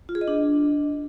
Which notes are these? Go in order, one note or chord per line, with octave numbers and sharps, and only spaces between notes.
F4
G#4
D#5
D4